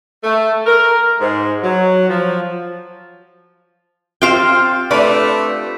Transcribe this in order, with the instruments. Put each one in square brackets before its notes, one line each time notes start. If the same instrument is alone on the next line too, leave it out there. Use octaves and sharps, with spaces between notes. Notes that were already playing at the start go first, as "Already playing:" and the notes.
[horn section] A3
A#4
G#2
F#3
F3
[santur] C4 F4 G4 [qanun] C5 F5 G5
[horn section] A3 [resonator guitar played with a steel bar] D4 B4 D5